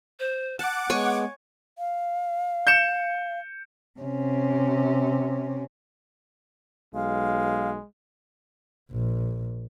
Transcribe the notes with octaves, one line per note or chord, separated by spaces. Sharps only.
C5
F#5 A5 D6 F#6
G#3 B3 C#5 G#5 C#6
F5
G6 C#7 E7
C3 C#4
B1 G#3 F5
A#1